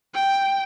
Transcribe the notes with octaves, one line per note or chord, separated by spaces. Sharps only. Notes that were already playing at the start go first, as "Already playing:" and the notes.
G5